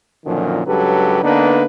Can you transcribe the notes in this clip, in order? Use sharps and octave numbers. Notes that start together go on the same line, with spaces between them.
F#2 A#2 D3 D#3 F3
C#2 G2 F#3 G4 A4 B4
D3 A#3 B3 D4 D#4 B4